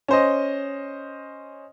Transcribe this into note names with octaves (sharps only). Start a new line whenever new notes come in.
C#4 C5 D#5